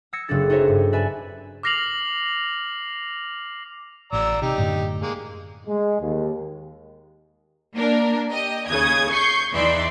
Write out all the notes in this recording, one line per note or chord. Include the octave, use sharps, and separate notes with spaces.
D#6 E6 G#6 A#6 C#7 E7
F#1 C#3 B3 D4 A4 A6
D#4 F#4 A4 C5 C#5 E5
G2
B4 D5 E5 G#5 A5 B5
D6 F6 A#6 C7 F7 F#7
A1 D5 A#5 E6
C3 D#4 G4
F#2 A2 D3
G#3 A#3
G#3
D#2
A#3 D4 A#4
G4 D#5
D#2 C#3 D#6 G#6
C#6 G6 C7
E2 E3 D#4 D5 E5 C6